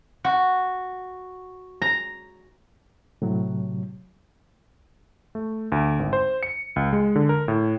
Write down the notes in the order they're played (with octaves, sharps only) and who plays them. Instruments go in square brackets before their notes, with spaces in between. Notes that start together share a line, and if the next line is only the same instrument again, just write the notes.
[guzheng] F#4
A#5
[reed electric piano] A2 C3 F#3
[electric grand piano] A3
D2
G#1
C5
C#7
C#2
G#3
D3
A#4
A2